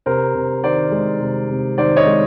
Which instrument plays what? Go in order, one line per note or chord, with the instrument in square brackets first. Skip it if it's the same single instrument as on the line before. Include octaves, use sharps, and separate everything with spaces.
[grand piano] C3 A#4 C5
C3
D#3 C5 D5
G#3
C3
C3
D#3 C5 D5
C#5 D#5
G#3